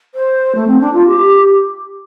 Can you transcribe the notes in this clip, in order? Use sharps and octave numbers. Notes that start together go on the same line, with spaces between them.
C5
A3
C4
D4
F4
G4